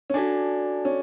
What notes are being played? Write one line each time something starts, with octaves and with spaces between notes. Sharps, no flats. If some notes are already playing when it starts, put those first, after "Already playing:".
C#4
D4 F#4 A4 D5 G#5
C#4